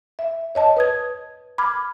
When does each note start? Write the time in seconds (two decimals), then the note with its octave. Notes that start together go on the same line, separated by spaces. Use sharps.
0.19 E5
0.55 C#5 D#5 A5
0.77 B4 D#6 G#6
1.58 B5 D6 F6 G#6